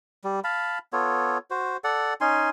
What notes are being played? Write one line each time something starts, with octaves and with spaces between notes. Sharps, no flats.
G3
F5 A5 B5
B3 F4 A4 C#5
F#4 C5
A4 D5 F#5
C#4 D#4 G#5 C6